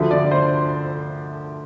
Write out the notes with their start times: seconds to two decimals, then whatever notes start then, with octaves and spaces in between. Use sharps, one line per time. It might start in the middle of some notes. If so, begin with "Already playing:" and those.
Already playing: D2 D3 F3 E5
0.11 D5
0.31 C5